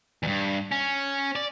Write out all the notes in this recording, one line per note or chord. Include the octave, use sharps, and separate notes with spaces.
E2 G2
C#4
D5